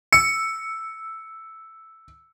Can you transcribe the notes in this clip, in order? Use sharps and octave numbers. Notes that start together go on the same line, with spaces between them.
E6 C#7